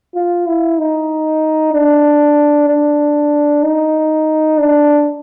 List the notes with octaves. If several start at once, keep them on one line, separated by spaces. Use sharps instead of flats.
F4
E4
D#4
D4
D4
D#4
D4